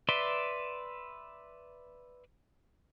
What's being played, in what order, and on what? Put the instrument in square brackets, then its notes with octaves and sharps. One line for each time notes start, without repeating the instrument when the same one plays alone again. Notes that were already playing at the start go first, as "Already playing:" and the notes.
[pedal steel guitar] B4 D5 E5 C6